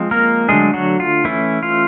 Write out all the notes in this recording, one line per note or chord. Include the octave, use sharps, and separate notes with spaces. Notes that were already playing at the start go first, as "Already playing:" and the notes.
Already playing: F3 G#3 C4
A#3 A#4
D3 F#3 G#3 A3 D4 G#4
F#3 F#4
F4
E3 A3 C#4 E4
F4